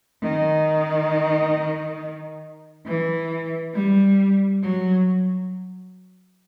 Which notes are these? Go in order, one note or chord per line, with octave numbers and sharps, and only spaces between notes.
D#3
E3
G3
F#3